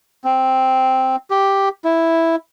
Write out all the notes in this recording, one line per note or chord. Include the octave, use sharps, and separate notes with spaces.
C4
G4
E4